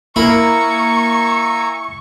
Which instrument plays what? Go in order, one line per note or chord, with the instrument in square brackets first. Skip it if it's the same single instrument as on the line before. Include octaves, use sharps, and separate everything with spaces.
[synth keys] A#3 A#4 [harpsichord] E4 [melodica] G#5 A#5 E6 [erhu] C#6